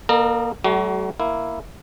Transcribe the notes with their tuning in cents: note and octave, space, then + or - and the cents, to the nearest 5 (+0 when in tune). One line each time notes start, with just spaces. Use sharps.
A#3 +25 A#4 -40 D#5 -25
F#3 +45 A3 -25 F#4 +30
A#3 +0 E4 +5